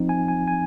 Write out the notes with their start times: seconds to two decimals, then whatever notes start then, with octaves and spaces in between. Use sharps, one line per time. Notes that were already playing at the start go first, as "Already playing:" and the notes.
Already playing: F3 C4 D#4
0.09 G#5
0.28 G#5
0.48 G#5